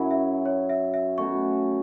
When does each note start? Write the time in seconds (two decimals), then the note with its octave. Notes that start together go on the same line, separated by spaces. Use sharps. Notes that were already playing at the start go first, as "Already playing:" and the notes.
Already playing: F#2 F#3 C#4 E4 E5
0.11 E5
0.46 C#5
0.69 E5
0.94 E5
1.18 B2 A3 C#4 F#4 C#6